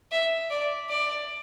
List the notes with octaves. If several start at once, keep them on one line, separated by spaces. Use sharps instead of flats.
E5
D5
D5